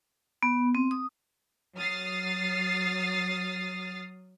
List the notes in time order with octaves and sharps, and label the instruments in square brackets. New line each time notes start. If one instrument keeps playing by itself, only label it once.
[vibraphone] B3
C4
D#6
[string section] F#3 D#6 F6 A6 C7